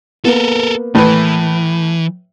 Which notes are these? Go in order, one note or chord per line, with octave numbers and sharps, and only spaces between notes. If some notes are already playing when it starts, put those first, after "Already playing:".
A#3 B3 A4 A#4
A2 E3 B4